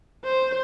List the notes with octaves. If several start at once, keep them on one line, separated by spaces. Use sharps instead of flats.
C5